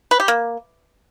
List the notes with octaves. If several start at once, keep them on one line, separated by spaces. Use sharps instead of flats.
B4
G4
A#3